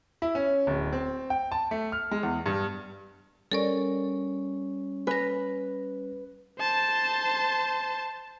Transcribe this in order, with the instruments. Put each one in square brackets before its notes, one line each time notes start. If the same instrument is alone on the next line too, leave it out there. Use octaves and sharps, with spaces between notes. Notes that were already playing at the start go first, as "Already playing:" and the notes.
[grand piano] E4
C#4
D1
C4
G5
A5
A3
F6
G#3
E2
G2
[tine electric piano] G3 C#4 C#6 [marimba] A4 A#4 D5
[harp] B4 [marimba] G#5 A#6
[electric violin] C5 A5